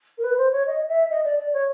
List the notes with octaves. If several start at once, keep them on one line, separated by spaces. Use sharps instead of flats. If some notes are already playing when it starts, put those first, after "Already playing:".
A#4
B4
C5
C#5
D#5
E5
D#5
D5
D5
C#5